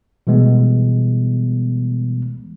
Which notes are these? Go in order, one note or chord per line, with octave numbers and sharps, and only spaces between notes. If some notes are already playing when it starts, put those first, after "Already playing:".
B2 E3 G3 G#3 B3